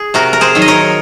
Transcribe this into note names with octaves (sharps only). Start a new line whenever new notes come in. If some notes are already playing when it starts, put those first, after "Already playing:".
Already playing: G#4
C3 F#4 A#4
A#4
G#4 C5
D#3 F#3
D#5
A#4 C#5